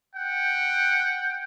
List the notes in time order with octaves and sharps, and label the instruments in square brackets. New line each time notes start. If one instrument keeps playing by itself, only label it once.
[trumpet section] F#5 G5